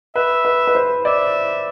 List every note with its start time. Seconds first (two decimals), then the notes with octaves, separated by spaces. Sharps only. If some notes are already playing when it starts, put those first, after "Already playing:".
0.16 B4 E5
0.45 B4
0.67 B4
0.75 C5
1.05 D5 E5